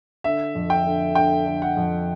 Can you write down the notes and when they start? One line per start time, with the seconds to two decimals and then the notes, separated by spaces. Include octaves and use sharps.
0.24 D3 E5
0.55 F2
0.70 G5
0.86 D3
1.15 D3 G5
1.46 D3
1.62 F#5
1.77 F2